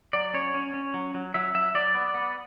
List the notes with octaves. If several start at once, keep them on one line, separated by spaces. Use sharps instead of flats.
F#3 D5
C#4 C#5
C#4
C#4
F#3
F#3
F#3 E5
F#3 E5
F#3 D5
B3
B3